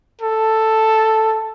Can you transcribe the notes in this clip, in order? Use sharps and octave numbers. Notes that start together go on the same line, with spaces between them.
A4